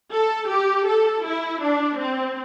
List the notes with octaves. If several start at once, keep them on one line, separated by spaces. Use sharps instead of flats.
A4
G4
A4
E4
D4
C4